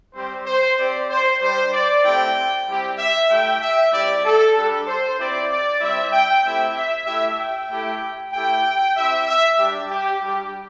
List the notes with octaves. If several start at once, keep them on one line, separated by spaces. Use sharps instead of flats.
G3 C4 G4 C5
C5
C4 G4 D5
C5
G3 D4 G4 C5
D5
A3 C4 E4 G4 G5
G3 C4 E4 G4
E5
A3 E4 G4 G5
E5
G3 C4 E4 G4 D5
A4
G3 D4 G4 A4
C5
C4 E4 G4 D5
D5
G3 C4 E4 E5
G5
A3 C4 E4 G4 E5
E5
A3 E4 G4 E5
G5
A3 E4 G4
A3 E4 G4 G5
C4 E4 G4 E5
E5
G3 D4 G4
G4
G3 D4 G4